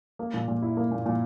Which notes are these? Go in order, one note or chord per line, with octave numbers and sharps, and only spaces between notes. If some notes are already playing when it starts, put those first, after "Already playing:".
A#3
A#2
A#2
E4
A#3
A#2
A#2